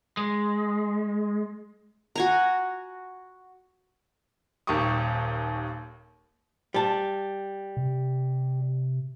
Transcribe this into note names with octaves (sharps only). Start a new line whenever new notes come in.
G#3
F#4 G#5 A#5
D#1 D#2 G4 C#6 D#6
G3 A5
C3